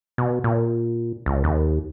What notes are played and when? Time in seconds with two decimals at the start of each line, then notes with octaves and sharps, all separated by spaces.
0.18 B2
0.44 A#2
1.26 C#2
1.44 D#2